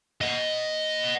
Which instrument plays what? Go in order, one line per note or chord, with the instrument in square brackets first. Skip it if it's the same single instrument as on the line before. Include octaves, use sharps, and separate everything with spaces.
[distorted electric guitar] D#5 F#5